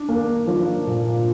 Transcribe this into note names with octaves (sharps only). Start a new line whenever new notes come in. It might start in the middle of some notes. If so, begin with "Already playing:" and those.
Already playing: D4
A#3
F3
A#2